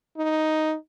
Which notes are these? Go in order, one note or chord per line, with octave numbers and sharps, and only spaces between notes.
D#4